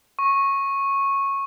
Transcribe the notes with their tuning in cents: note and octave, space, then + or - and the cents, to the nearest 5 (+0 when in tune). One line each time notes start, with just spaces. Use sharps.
C#6 -10